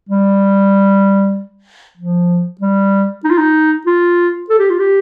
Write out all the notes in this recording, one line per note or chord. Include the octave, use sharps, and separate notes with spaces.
G3
F3
G3
D#4
F4
D#4
F4
A4
G4
F4
G4